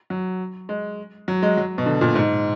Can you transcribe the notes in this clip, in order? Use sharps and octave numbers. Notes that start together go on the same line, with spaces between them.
F#3
G#3
F#3
G#3
F#3
B2
D3
A#2
G#2